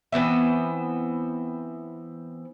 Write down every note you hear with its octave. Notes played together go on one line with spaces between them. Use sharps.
E3 B3 C4 E5